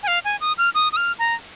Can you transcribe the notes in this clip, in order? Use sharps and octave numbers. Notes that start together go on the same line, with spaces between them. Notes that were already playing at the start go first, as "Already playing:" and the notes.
G#5
F5
G#5
D#6
F6
D#6
D#6
F6
A#5